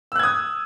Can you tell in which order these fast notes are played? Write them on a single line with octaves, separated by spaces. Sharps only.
E6 F#6 G#6 D#6